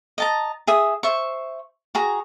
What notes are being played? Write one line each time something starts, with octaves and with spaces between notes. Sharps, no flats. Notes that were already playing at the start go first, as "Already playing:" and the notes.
D#5 A5 A#5
G#4 E5 D#6
C5 E5 C#6
F#4 G#4 A#5